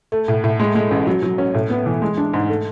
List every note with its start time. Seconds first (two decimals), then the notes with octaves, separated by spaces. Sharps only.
0.12 A3
0.28 A2
0.44 A2
0.60 G#3
0.75 G#3
0.91 A1
1.07 F#3
1.23 F#3
1.38 C#4
1.54 A2
1.70 B3
1.86 E3
2.02 G#3
2.17 D4
2.33 G#2
2.49 A3